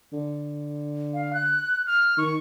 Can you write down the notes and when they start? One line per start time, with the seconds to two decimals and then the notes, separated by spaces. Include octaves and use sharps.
0.13 D3
1.14 F5
1.33 F#6
1.87 F6
2.18 D#3 C#6